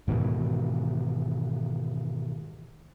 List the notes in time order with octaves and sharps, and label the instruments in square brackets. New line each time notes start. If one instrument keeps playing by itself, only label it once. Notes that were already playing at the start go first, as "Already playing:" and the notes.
[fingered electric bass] G#2 B2 D#3 E3